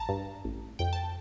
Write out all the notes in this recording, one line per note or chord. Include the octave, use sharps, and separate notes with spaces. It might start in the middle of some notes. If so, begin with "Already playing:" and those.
Already playing: A1 A5 A#5
G2
A1
F2 G5
A5